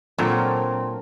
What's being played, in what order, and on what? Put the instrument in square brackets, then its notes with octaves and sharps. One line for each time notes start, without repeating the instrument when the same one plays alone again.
[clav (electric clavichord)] A#2 [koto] F#3 [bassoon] C4 [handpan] D4 A4 A#4